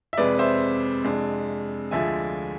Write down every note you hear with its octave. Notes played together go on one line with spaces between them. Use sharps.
E5
F2 C3 G#3 B4 D5
C5 E5
F2 C3 G#3 D4
D2 D3 F3 G#3 E5 G#5